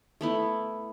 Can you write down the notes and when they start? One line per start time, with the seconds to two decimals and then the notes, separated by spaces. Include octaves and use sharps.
0.21 A3 B3 E4